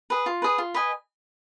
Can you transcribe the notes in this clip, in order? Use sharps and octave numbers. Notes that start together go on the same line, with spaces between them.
G#4 B4
F4
G#4 B4
F4
B4 D#5 G#5